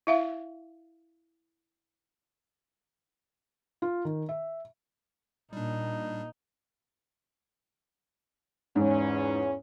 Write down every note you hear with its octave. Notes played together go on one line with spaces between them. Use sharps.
E4 E5 F5
F4
D#3
E5
A#2 G3 D4 D#4
E2 G#2 C#4